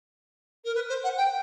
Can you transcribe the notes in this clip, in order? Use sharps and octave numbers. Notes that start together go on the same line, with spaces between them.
A#4
B4
C5
F#5
G5